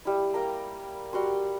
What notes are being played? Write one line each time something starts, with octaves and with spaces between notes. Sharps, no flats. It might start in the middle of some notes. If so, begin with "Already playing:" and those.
G3 E4
A#3 G5 A#5
G3 F#4 C6